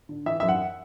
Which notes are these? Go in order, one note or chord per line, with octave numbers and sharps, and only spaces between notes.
D3
E3 E5
F#2 E5
F#5